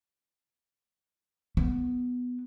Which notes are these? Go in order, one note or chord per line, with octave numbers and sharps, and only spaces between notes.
B3